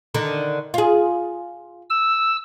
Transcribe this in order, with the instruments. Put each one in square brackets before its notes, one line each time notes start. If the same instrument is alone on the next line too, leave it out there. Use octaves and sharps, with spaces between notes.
[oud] D3 D#3 D4
F4 G#4
[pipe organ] E6